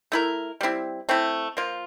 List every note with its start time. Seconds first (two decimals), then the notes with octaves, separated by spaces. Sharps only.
0.12 A3 E4 A#4
0.61 G3 C4 E4
1.09 A3 C4 E4
1.57 F3 A#3 F4